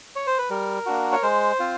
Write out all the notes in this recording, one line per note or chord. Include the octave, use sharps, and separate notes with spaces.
C#5
C5
B4
G3 A#4
A#3 D4 F#4
C#5
G#3 C5
C4 F4